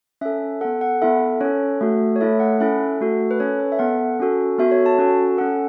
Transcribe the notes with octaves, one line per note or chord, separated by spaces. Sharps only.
C#4 A4 E5
B3 A4 F#5
F#5
B3 E4 A4 E5
C#4 A4 C#5
A3 F#4 A4
C#5
A3 E4 A4 E5
F#5
C#4 E4 A4 E5
A3 F#4 A4
B4
C#4 A4 C#5
B4
E5
B3 A4 F#5
C#4 F#4 A4
B3 F#4 A4 E5
C#5
A5
C#4 F#4 A4
C#4 A4 F#5